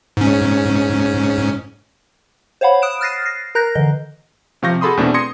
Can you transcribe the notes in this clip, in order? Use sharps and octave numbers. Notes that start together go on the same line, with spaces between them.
G#2 C#4
C5 C#5 F5 F#5 B5
D#6 F#6 D7 E7
F6 F#6 A6 A#6 C7 D#7
A#6 C7
A#4 A#5 F#6 G6 A#6
D3 E3 D#5
C3 F3 F5 C#6 G6 A#6
F#4 G#4 A4 B5 C6 D#6
E2 B2 A3 C4 D4
C6 D#6 G#6 A#6 C#7